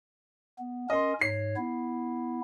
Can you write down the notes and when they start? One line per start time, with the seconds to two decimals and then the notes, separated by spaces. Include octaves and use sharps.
0.59 B3
0.90 C#4 A#4 D#5 C6
1.21 G#2 C#5 C7
1.57 B3 E4